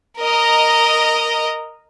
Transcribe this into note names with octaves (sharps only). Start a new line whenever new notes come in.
A#4 D#5 A#5